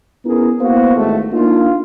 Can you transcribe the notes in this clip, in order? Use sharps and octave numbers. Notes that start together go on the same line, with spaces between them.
B3 C#4 E4 G#4 A#4
A#3 B3 E4 F#4 C5 F5
G#1 A3
A#3 D4 D#4 F4